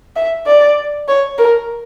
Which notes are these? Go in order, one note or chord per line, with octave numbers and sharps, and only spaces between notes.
E5
D5
C#5
A#4